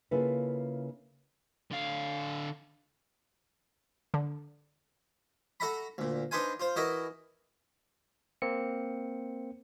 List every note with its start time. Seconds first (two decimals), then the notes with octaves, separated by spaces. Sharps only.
0.11 C#3 A#3 E4 F4 A4 B4
1.71 D3 F5
4.14 D3
5.60 F#4 A4 E5 F#5 A#5 B5
5.98 D2 A#2
6.31 D4 D#4 B4 C5 F5 G#5
6.60 F4 C5
6.76 E3 E4 F#4 A#4 D#5 E5
8.42 A#3 C4 C#7